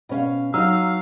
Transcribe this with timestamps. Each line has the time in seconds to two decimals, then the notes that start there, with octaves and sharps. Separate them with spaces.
0.09 B2 C#4 F5
0.54 F#3 D#4 F5 E6